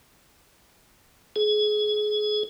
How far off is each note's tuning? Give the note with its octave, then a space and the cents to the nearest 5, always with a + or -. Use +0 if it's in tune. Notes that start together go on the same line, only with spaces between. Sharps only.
G#4 +25